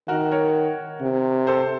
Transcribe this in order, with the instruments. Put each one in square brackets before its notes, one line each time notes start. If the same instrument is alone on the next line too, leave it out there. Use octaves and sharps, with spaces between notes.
[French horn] D#3 [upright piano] F#4 A#4
[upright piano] A#4 C#5
[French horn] C3
[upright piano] A4 C5